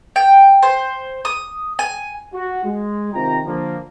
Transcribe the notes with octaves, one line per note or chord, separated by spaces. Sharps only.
G5
C5
D#6
G#5
F#4
G#3
C3 D#3 C4 F4 G5 A#5
D3 F3 A#3